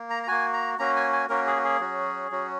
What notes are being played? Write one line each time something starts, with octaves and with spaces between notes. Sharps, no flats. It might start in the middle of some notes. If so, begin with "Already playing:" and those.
Already playing: A#3
A#5
A#5
A#3 F#4 G#5
A#5
A#3 C#4 F#4 A#5
G#5
G#5
A#3 C#4 F#4 A#4
G#4
F#4
G#4
F#3 C#4 F#4
F#3 C#4 F#4